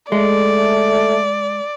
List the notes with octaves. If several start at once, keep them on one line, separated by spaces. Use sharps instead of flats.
G#3 A3 D5